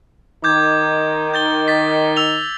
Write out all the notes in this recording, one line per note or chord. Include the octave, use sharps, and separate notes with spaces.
D#3 D#4 D6 G6 G#6
G6 A6 G7
A6 B6
E6 F7 G7